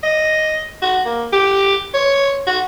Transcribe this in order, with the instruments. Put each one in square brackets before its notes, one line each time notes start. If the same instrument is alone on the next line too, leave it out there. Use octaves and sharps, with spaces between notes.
[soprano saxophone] D#5
F#4
A#3
G4
C#5
F#4